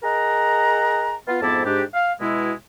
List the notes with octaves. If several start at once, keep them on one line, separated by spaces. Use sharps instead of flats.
G#4 A#4 D#5 F#5 A#5
B3 F4
F2 G#2 B3 E4 A5 D6
G#2 D4 G4
F5
B2 G#3 E4